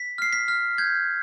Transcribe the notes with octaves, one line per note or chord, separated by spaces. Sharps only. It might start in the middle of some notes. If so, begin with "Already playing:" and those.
Already playing: B6
F6 C7
B6
F6
G6 G#6